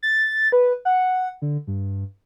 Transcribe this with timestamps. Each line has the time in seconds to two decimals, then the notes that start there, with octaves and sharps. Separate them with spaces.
0.03 A6
0.52 B4
0.85 F#5
1.42 D3
1.67 G2